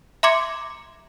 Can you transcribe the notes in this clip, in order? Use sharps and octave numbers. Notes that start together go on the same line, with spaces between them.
E5 A#5 C6 D6 G#6 C#7